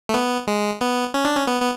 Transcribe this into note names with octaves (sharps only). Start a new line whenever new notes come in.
A3
B3
G#3
B3
C#4
D4
C#4
B3
B3